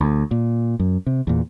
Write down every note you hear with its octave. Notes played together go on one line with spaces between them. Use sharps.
D2
A#2
F#2
C3
E2 A#2